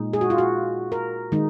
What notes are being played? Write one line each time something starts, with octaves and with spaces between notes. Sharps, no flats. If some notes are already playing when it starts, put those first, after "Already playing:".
Already playing: A#2 G#3 D#4
G#4
F#4
F4
F#4
A#4
D#3 G#3 D#4